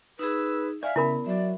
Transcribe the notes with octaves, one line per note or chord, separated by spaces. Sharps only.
D#4 G#4 B4 E6
D5 E5 F5 G#5
C#3 B3 E4 A#4 B5
F#3 D5 E5